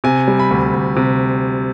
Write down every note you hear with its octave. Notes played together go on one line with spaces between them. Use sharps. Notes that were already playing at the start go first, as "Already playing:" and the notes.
C3 G#5
G3
B5
D2
D2
C3